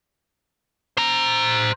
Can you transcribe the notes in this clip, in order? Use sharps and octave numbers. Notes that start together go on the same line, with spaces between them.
C5 A#5